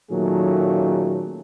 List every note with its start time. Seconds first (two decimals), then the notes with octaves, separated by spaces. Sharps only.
0.11 A#2 D#3 F#3 A3 C#4 G#4